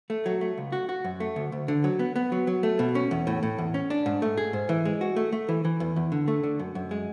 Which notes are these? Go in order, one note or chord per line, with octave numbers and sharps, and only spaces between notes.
A3
F#3
A3
C#2
F#4
F#4
F#2
A3
D2
D2
D3
F#3
B3
B3
F#3
F#3
A3
B2
C#4
E2
A2
A2
E2
C#4
D4
G#2
A3
G#4
G#2
E3
G#3
F#4
A3
A3
E3
E3
E2
E2
D3
A3
D3
F#2
F#2
G#3